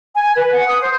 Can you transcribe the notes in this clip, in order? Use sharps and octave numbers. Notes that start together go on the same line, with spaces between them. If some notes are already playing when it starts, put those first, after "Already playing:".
G#5
B4
F#5
D#6
C5